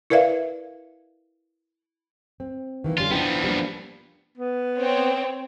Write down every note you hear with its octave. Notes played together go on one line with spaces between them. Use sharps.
E4 A#4 B4 D5 E5 F5
C4
D#3 E3 A#3
D3 G3 C#4 F4
F3 B3 D4 E4 G5
G3 A#3 D4
B3
C4 C#5